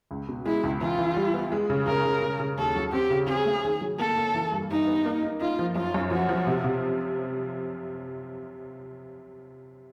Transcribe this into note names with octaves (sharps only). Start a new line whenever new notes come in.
C#2
B2
G#3 E4
C#2
E3 F4
E3
G3
B3
G#3
C#3
C#3 A#4
C#3
C#3
C#3
D#2 A4
F#3
C4 G4
C#3
C4 G#4
A3
D#3
F#3
A#3 A4
A#3
E3
G2
G2 D#4
B3
A#3
D#4
D#4 F4
F3
F#2 F4
F#2
F3 F#4
F3
C3
C3